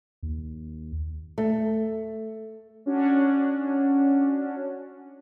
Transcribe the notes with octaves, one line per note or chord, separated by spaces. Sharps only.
D#2
A3
C#4 D4 F#4